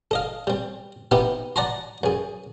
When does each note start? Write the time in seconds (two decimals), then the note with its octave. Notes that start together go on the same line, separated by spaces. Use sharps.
0.11 A4 D#5 F5
0.47 G3 C4
1.11 B3 C4 D#4 E4 G4
1.56 D5 F#5 A5 A#5 C6
2.03 F#2 G#4